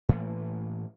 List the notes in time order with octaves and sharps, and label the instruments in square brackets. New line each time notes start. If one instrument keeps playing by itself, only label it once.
[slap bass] A2 E3 A3 A#3